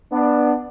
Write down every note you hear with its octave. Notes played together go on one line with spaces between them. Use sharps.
B3 D4